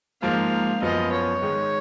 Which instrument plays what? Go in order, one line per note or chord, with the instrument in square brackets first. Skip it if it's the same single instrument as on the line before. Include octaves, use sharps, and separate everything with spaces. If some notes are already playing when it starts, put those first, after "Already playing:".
[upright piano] G#2 F3 A#3 [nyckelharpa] F5
[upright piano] F#2 F3 B3 F4 [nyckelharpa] D#5
[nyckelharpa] C#5
[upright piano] G#2 D#3 G#3